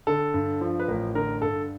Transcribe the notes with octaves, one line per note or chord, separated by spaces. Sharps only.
D3 A4
G2
F3
B4
A1 A#4
D3 A#4
G2 A4